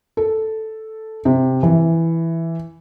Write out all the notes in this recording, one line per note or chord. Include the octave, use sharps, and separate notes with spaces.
A4
C3
E3